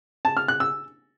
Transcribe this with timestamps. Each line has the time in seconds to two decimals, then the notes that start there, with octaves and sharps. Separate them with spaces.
0.25 A5
0.37 F6
0.48 F#6
0.60 E6